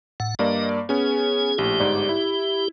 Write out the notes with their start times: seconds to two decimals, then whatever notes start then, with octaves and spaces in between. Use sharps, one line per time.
0.20 A2 F#5
0.39 G2 A#3 D5 D#5
0.89 B3 C#4 G#4
1.58 A#1 A2 G4
1.80 G1 G#2 D5
2.09 E4